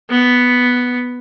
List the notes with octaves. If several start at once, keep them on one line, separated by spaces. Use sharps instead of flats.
B3